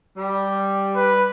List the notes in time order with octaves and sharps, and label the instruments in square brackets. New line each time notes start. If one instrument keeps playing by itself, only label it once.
[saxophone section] G3
[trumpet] B4